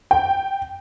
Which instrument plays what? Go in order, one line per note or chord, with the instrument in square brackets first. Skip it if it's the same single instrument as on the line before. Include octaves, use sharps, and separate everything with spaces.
[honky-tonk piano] G5